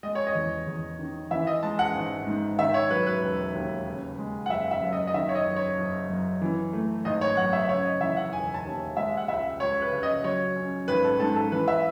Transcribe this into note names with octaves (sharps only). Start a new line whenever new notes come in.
G#3 D#5
C#5
D#5
E2
E2
D#3
E3 E5
D#5
G#3 A5
F#5
G#1
G#2
D#3 E5
C#5
F#3 B4
B4
E1
D#2
C#3
G#3
F#5
F#1 E5
E5
F#2
D#5
D#5
D#3 E5
C#5
D#5
F#1
C#5
F#1
F#2
E3
A3
G#1 D#5
C#5
F#2 F#5
E5
C#3 C#5
D#5
E3 E5
F#5
E1 G#5
A5
D#2
G#3 E5
F#5
C#2 E5
C#2 C#5
B4
C#3
D#5
F#3 C#5
C#4
G#1 B4
A4
G#2 A4
A4
E3 B4
E5